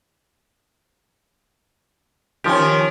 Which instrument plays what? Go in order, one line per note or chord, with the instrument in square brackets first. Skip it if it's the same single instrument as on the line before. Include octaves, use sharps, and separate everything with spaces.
[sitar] D#3 C#4 [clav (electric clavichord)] F3 G4